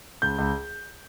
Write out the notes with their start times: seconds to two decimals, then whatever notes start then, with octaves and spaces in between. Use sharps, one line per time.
0.22 C#2 G6
0.38 C#2